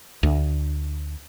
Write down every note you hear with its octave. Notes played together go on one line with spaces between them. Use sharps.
D2